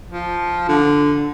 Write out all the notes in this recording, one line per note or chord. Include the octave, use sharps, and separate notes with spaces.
F3
D3